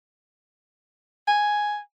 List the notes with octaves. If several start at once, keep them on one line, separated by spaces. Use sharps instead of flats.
G#5